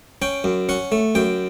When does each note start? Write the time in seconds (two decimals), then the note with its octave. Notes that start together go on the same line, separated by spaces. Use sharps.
0.22 C#4 G5
0.44 F#2
0.69 C#4 F#5
0.92 A3
1.15 F#2 G5